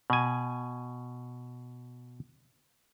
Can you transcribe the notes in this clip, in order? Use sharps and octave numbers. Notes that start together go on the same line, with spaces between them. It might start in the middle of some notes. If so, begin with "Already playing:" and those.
B2 G#5